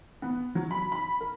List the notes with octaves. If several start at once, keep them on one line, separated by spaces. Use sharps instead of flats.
B3
F#3
B5
B5
A#4